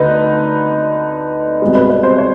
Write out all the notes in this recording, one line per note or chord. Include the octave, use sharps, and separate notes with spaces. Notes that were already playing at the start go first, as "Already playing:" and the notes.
Already playing: D2 D3 D#4 B4
C2 B2 G#3
B4
B4
C5
C#5